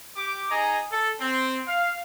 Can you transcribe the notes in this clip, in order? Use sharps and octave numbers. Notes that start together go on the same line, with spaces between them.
G4 D6
D#4 G#4 D#5 G#5 A#5
A4
C4
F5